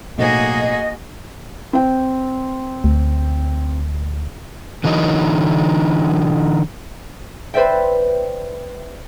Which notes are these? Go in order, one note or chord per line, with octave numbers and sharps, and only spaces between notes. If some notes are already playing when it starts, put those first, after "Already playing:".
B1 A2 A#3 F#4 G#4 D#5
C4 C5 G5
D2
D3 E3 F#3 D#4
B4 C5 D5 E5 G5